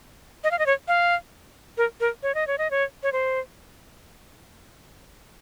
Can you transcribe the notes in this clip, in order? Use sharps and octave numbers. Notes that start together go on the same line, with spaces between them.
D#5
F5
D#5
C#5
F5
A#4
A#4
C#5
D#5
C#5
D#5
C#5
C#5
C5